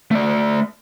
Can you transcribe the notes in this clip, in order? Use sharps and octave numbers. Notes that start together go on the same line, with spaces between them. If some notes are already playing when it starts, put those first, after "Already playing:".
A3 D5